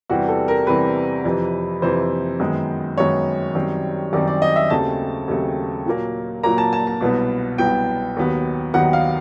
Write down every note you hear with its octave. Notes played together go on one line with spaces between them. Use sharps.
E2 C3 E3 G3 C4 F#4
A4
A#4
E2 C3 E3 G3 C4 B4
F2 C3 E3
F2 C3 E3 C5
F#2 D#3 G#3 B3
F#2 D#3 G#3 B3 C#5
F#2 D#3 G3 C4
F#2 D#3 G3 C4 D5
D5
D#5
E5
D#2 C#3 F#3 A3 C4 A5
D#2 C#3 F#3 A3 C4
A#2 F#3 A#3
A#2 F#3 A#3 A#5
A5
A5
A5
C2 B2 F#3 B3
C2 B2 F#3 B3 G5
D#2 D#3 F#3 B3
D#2 D#3 F#3 B3 F#5
F5